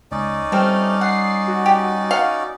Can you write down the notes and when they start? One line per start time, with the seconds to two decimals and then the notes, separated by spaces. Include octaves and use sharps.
0.12 C#2 C#4 D#4 D5
0.52 G3 A3 C4 F6
1.01 F#5 C7
1.48 F#4
1.66 G4
2.11 F5 F#5